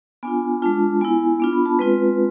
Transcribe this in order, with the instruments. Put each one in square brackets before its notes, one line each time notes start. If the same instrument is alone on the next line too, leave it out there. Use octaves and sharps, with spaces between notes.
[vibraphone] B3 D4 F4 G#5
G#3 D4 F4 A5
B3 E4 G#5
B3 D4 F4
B5
A5
G#3 C4 F4 B4